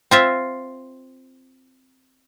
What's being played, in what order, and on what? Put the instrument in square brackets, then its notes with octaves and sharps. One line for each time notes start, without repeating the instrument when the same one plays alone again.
[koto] C4 F4 E5